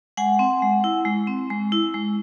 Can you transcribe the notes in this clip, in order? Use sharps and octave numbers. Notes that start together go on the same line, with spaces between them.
G#3 F#5 G#5
C4
G#3
E4
G#3
C4
G#3
E4
G#3